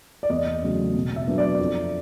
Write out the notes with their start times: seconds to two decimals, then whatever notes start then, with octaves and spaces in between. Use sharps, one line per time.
0.23 D5
0.30 E2 D#5
0.62 C#3 F#3 A3
0.95 B2
1.16 E5
1.27 F#3 B3 D4
1.38 D5
1.59 F2